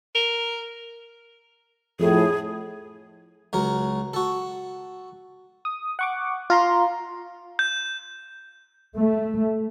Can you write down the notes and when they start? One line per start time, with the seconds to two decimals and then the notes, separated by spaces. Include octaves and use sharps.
0.15 A#4
2.00 F2 A2 G#4
3.53 C#2 F#3 A#4
4.14 F#4 A4
5.65 D#6
5.99 F#5 C#6 D6
6.50 F4 A#5 C6
7.59 G6
8.94 A3